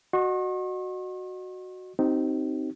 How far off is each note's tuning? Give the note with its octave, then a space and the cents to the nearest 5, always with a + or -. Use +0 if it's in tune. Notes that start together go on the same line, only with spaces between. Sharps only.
F#4 +0 D#5 -30 C#6 -45
C4 +0 D#4 +0 G4 -35